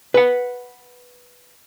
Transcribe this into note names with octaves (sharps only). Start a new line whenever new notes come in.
B4 F#5